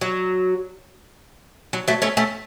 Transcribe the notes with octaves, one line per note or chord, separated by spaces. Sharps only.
F#3
F#3
F#3 A3
A3 C#4
A3 C#4